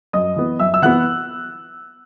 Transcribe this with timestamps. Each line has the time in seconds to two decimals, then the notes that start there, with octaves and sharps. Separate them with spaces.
0.13 F#2 D#5 D#6
0.36 E3 B3
0.59 F#2 E5 E6
0.74 E6
0.82 E3 B3 F#5 F#6